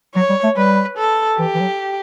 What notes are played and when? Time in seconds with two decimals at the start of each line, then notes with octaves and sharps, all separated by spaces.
0.15 F#3 C#5
0.30 G3
0.44 A3
0.57 G3 B4
0.98 A4
1.39 E3 G4
1.55 E3
1.60 F#3